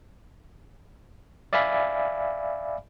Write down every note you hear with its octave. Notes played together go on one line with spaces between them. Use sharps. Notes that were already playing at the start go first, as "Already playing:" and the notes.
D5 E5 F5 G#5 B5